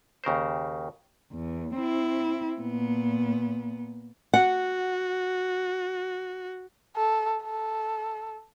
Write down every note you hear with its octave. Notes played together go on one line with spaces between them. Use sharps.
D#2 C#3 A#4 C5
E2
C4 E4
A#2 B3
F#4 F#5
A4
A4